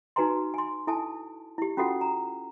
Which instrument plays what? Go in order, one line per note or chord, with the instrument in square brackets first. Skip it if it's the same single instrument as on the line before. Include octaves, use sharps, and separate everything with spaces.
[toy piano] D#4 F#4 B4 G#5 A#5 C6
G#5 C6
E4 A4 G#5 A5
E4 G4
C#4 F4 F#4 A4 F#5
A#5